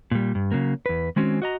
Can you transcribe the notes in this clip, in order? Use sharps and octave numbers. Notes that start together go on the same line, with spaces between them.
A#2 G3
G2
C#3 F#3 A#3
E2 B4
D#3 G#3 C4 C#4 F#4
F#4 D#5 A#5